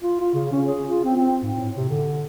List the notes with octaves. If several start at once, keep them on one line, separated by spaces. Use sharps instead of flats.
F4
F4
C#3
C#4
G#4
F4
C4
C4
G#2
A2
C3
D3